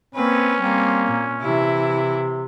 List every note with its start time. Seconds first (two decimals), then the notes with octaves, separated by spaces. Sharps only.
0.15 A#3 C4 C#4 B4
0.61 G3 A#3 C4
1.07 A#2
1.41 C3 E3 E4